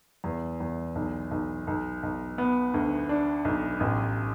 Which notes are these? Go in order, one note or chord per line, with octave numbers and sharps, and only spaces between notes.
E2
E2
B1
B1
B1
B1
B3
D2
D4
B1
A1